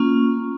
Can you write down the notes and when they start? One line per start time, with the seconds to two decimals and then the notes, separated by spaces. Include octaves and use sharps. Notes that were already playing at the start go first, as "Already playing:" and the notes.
Already playing: A#3 C#4 F4